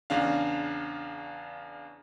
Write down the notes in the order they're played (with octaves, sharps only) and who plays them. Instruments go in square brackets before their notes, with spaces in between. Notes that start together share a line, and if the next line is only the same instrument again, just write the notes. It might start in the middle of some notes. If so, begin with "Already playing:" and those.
[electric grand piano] E2 C#3 D4 F5